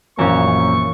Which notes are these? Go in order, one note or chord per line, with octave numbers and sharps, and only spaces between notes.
A#1 F#2 E3 A#3 C#4 C#6